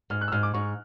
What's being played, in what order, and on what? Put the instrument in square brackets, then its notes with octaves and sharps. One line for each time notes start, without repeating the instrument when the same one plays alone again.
[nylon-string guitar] G#2 [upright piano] F6
[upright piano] F#6
E6
[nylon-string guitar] G#2 [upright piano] F6
[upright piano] D6
[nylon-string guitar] G#2 [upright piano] C#6